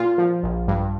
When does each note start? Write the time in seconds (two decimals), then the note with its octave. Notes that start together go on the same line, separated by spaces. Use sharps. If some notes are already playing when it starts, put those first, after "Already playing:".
Already playing: A#2 F4
0.18 F3
0.43 A#1
0.68 G2